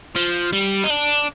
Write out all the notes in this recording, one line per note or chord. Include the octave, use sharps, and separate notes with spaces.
F3
G3
D#4
D4